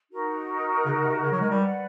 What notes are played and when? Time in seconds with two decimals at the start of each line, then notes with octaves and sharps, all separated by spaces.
0.11 D#4 F#4 A#4
0.85 C#3
1.04 C3
1.23 C#3
1.31 F#3
1.41 G#3
1.50 G3
1.60 B4 D5 F#5